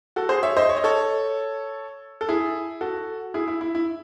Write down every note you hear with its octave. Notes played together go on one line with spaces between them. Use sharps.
F#4 A4
G#4 C5
C#5 E5
C5 D#5
C#5
D#5
A4 C#5
A4
E4 G#4
F#4 A4
E4 G#4
E4
E4
E4